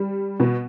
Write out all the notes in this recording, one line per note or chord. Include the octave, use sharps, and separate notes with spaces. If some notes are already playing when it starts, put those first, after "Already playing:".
Already playing: G3
B2